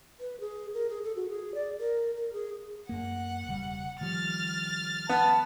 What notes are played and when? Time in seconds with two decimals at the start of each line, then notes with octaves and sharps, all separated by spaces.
0.20 B4
0.40 G#4
0.73 A#4
0.89 G#4
1.03 A4
1.16 F#4
1.29 G#4
1.54 D5
1.79 A#4
2.15 A#4
2.33 G#4
2.89 F#2 A#3 F#5
3.47 E1 C#3 G3
4.01 D#3 F3 G3 F6 A6
5.09 B3 A5